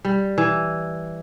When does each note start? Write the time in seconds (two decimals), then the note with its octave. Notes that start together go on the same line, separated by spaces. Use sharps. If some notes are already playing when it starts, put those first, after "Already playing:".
0.05 G3
0.38 E3